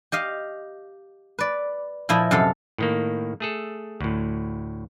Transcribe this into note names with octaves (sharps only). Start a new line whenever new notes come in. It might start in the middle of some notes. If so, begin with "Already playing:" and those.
G4 D#5 F5
B4 D5
A#2 F3 E4 D#5
F#2 C3 A4 F5
A2 D#3 A#3
A3 G#4 A4
D2 A2